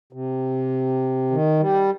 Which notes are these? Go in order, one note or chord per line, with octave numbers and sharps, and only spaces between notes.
C3
D#3
G3